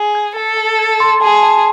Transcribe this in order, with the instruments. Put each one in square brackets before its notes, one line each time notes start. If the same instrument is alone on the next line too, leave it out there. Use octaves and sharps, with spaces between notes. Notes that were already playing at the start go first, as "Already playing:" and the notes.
Already playing: [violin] G#4
[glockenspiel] G#6
[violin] A4 [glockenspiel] A5
[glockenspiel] A5
G#6
C6
[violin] G#4 [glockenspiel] A5
[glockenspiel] A5